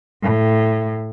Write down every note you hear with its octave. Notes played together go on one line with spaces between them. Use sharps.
A2